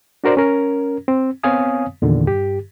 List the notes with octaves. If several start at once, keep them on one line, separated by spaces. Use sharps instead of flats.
D4 F#4 A#4 C5 D5
C#4 A#4
C4
B3 C4 C#5 F5 G#5 D#6
E2 A#2 D3 D#3
G2 G4